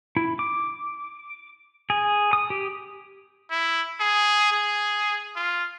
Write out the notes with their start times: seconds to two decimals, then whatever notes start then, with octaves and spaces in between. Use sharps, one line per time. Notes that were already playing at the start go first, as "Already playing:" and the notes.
0.17 E4
0.39 D6
1.90 G#4
2.33 D#6
2.50 G4
3.51 E4
4.00 G#4
4.52 G#4
5.36 F4